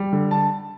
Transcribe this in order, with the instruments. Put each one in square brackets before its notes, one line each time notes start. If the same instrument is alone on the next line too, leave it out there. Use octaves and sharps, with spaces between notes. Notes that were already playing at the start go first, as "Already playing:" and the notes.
Already playing: [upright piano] G3
D3
[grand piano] A5